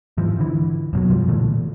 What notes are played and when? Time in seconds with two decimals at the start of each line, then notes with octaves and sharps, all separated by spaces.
0.17 G#2 E3 F3
0.39 D3 E3
0.93 F#2 B2 F#3
1.08 B1 F3 G3
1.28 A#2 D3 E3 A3